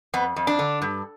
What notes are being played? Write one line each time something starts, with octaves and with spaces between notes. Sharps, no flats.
F2 B3
F2
D4
D3
G2